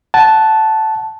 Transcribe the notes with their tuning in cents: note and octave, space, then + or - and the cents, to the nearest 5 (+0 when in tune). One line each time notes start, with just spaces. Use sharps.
F#5 +10 A5 -5